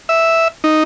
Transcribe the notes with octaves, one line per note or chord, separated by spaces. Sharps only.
E5
D#4